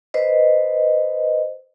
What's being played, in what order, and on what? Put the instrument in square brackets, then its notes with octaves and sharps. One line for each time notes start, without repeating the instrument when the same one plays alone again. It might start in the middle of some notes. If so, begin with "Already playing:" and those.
[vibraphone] B4 C5 D#5